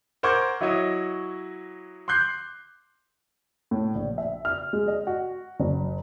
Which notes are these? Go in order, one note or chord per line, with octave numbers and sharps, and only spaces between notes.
A#4 C5 F#5 C#6 D6 G#6
F#3 E4 F#4 C#5 D#5
C6 D6 F#6 G6 C7
A2
A#1
E5
F6
G#3
D#5
F#4
F#1